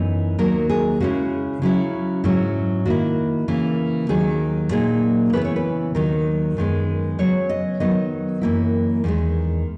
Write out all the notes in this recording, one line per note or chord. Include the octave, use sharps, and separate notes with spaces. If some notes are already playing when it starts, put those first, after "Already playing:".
Already playing: F#2 E3 B3 D#4
D#2 D#3 F#3 A#3 A#4
G#4
C#3 G#3 C#4 E4 F#4
C#3 F#3 C#4 E4
G#2 F#3 C#4 E4
D#3 A#3 E4 F#4
C#3 E3 A#3
D#2 D#3 F#3 G#4
A#2 F#3 A#3 D#4 G#4
C#3 E3 B3 E4 B4
C#5
B4
D#2 D#3 F#3 A#4
F#2 D#3 G#3 B3
C#3 F#3 B3 C#5
D#5
D#3 F#3 B3 D#4 D#5
F#2 E3 A#3 E4
E2 D#3 G#3